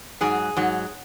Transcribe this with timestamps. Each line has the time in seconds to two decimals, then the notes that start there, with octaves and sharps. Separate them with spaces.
0.21 G#2 F#3 G#4
0.57 G#2 F#3